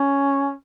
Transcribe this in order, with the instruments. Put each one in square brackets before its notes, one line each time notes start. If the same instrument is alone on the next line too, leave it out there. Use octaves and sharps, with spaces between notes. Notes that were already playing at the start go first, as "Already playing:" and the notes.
Already playing: [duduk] C#4